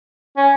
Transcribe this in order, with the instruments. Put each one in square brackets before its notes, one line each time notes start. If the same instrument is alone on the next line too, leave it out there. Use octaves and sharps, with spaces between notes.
[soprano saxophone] C#4